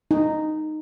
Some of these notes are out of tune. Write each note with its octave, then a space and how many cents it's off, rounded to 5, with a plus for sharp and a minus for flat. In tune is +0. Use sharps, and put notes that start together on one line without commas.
D#4 -10